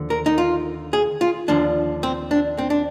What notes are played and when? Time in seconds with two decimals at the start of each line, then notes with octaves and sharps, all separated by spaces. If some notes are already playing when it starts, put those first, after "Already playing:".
Already playing: D#2 D3 F3
0.10 A#4
0.26 D#4
0.38 F4
0.93 G#4
1.21 F4
1.48 D#2 D3 F3 D4
2.03 C4
2.31 D4
2.58 C4
2.70 D4